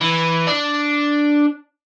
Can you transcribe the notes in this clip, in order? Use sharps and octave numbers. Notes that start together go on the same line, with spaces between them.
E3
D4